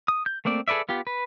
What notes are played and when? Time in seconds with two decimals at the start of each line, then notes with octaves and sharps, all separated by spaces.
0.08 D#6
0.26 G6
0.45 A3 A#3 C4 D5
0.68 G#4 A4 B4 D5 E5
0.89 B3 F4 G4
1.07 B4